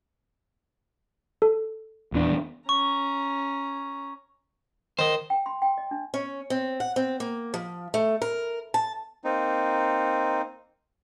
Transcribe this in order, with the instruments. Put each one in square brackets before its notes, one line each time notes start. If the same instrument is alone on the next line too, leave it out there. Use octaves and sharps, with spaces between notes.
[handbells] A4
[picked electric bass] D#1 E2 D4
[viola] C#4 A#5 [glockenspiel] C#6
[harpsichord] D#3 [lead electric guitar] C5 D#5
[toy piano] G5
C6
G5
D#5
D4
[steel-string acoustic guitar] C#4
C4
F#5
C4
A#3
F3
A3
A#4
A5
[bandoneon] A#3 C4 D#4